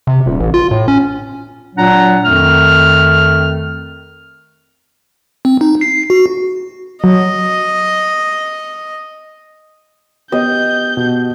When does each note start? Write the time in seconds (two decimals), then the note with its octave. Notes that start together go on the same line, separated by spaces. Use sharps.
0.07 C3
0.26 D#1
0.40 A1
0.54 F4
0.71 A2
0.88 C#4
1.76 A#2 F#3 D4 F#5 A#5
2.24 F2 D#3 A3 F6
5.45 C4
5.61 D#4
5.81 C7
6.10 F#4
7.04 F#3 D#5
10.32 B3 G4 D#5 G6
10.97 B2